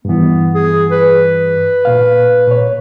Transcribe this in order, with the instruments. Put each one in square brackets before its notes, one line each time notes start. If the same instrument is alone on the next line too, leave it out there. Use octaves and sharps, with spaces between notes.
[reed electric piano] G2 E3 [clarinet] B3
[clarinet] G#4
B4
[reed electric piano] A#2 F5
A#2 C#5